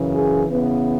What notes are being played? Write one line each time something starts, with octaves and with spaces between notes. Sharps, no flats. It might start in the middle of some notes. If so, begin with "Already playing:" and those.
Already playing: F#2 C#3 E3
G#4
C#3 E3 B3